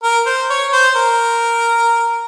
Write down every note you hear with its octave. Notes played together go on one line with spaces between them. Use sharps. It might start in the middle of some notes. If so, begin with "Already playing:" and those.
A#4
C5
C#5
C5
A#4